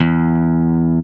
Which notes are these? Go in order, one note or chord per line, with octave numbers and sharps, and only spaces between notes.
E2